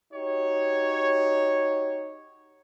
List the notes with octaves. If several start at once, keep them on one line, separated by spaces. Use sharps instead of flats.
D#4 F#4 G4 C#5